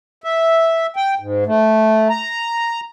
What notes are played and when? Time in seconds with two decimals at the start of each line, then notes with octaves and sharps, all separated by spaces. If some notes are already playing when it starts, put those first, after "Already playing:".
0.24 E5
0.96 G5
1.20 G#2
1.46 A3
2.10 A#5